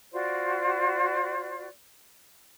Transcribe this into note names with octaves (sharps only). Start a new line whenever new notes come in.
F4 F#4 C5 D5